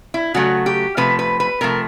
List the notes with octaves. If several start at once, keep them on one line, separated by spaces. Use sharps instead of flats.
E4
C#3 F#3 A3 F#4
G4
C3 F3 A3 B4
B4
B4
C3 F3 A3 A#4